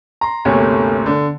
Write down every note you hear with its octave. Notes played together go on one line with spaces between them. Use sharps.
A#5 C6
G1 D2 C3 A3 A#3 C#5
D3